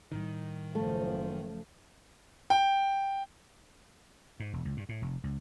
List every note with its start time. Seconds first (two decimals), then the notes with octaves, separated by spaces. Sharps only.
0.12 A2 D#3 G3
0.75 F#1 F3 A3
2.50 G5
4.40 G#2
4.53 E1
4.65 C#2
4.77 G2
4.89 A2
5.02 F1
5.24 C#2